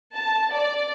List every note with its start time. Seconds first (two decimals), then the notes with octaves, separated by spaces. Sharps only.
0.16 A5
0.55 D5